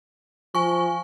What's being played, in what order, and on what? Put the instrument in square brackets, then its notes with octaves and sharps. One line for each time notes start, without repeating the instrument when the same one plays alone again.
[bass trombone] F3 [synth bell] G#5 C#6